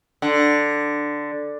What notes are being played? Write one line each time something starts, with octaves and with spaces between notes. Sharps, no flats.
D3